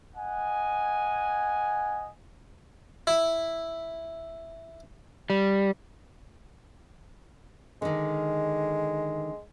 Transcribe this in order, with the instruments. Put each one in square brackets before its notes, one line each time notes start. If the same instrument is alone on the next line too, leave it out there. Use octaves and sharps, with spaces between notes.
[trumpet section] D#5 F#5 G#5
[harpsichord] E4
[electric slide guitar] G3
[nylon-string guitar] D3 D#3 [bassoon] G#3